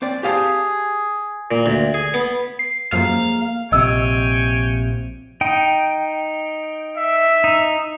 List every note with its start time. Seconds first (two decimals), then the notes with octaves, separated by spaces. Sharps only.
0.02 C4 D5
0.23 G4 G#4 F5 A5
1.51 A#2
1.66 D2
1.94 G#4
2.14 B3
2.59 C7
2.92 F#2 F3 G#3 A#3 F5
3.72 A#1 C3 C#5 D#5 G5 G#5 E6
5.41 D#4 G5
6.97 E5
7.44 D#4